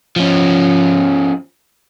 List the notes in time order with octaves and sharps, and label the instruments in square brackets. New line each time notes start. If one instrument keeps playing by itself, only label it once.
[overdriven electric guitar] F3 C#4